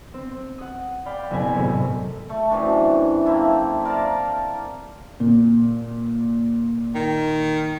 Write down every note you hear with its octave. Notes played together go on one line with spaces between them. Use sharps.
C4
F#5 D#6
D5 F5 G5 B5
F#1 B2 C4 B4 G#5
G#1 A2 C3
A3
F#2 C3 E3 D4
A#3 C4 E4 A4
A#4 D5 F5 A5
A#2
D#3